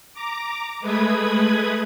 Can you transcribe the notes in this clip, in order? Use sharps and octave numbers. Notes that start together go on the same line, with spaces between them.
A#5 D6
G#3 A3 B4 B5 D#6 G#6